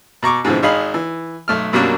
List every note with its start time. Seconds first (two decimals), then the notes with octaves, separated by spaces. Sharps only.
0.23 B2 A#5 C#6 D6
0.45 G#2 B2 D3 E3 F3 C4
0.63 G#1 D#4 G#4 F5 B5
0.94 E3
1.48 B1 A3 F6
1.73 F#2 B2 F#3 G3 A#3 D4